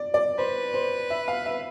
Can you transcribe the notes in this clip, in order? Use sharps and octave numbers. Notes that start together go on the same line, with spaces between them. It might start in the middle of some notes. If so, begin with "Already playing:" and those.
Already playing: D5
D5
B4 C5
C5
E5
F5
E5